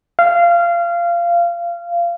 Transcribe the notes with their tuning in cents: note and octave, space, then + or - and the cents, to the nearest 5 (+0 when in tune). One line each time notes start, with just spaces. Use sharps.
F5 -20